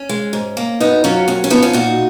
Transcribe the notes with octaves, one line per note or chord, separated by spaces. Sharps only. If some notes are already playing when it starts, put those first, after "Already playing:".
Already playing: C#4
G#3
G#2
A#3
F#2 B3 D#4
F#3 C#4 F4
D#2 C#4
C#4
F3 B3 D#4
C#4 F4
A#2 D#4 F#4